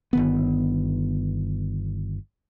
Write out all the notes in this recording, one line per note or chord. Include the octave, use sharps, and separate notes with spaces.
G1 D#3 B3